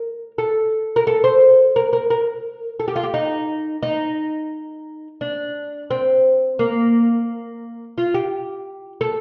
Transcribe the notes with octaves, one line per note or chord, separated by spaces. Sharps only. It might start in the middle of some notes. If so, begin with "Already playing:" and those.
Already playing: A#4
A4
A#4
A4
C5
A#4
A#4
A#4
A4
G4
F4
G4
D#4
D#4
D4
C4
A#3
F4
G4
A4